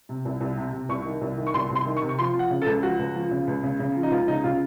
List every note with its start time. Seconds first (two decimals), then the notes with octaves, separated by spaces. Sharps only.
0.09 C3
0.25 C2
0.40 C2
0.57 C3
0.73 C3
0.89 C2 C#6
1.05 D#3
1.21 C2
1.38 D#3
1.47 C#6
1.54 C2 C6
1.70 C2
1.75 C6
1.86 D#3
1.96 C#6
2.02 C3
2.09 C#6
2.18 F3 C6
2.34 F3
2.39 F#5
2.50 C#3
2.62 A4
2.66 C#2
2.83 F3 F#4
2.99 C#2
3.15 F3
3.31 C#3
3.47 C#2
3.63 C#3
3.79 C#3
3.96 F3
4.03 D#4
4.11 C#2 F4
4.27 C#3 D#4
4.44 C#3 F4